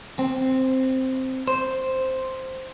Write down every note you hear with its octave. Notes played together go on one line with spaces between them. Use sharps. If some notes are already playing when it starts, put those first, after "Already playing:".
C4
C5